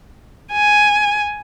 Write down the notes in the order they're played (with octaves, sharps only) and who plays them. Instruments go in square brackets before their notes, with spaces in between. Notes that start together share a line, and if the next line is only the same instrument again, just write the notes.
[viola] G#5